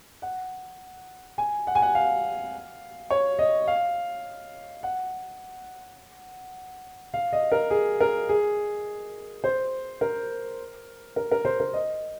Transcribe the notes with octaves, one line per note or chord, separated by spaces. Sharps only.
F#5
G#5
F#5
G#5
F#5
F5
C#5
D#5
F5
F#5
F5
D#5
A#4
G#4
A#4
G#4
C5
A#4
A#4
A#4
C5
A#4
D#5